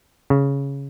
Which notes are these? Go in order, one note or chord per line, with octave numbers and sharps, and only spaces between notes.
C#3